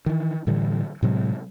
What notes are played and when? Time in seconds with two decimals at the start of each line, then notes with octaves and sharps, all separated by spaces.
0.06 D#3 E3
0.47 A2 D3 E3 G3
1.02 A2 C3 F#3 G#3